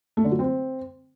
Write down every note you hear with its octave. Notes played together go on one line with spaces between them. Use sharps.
A3
D3
F#3
C4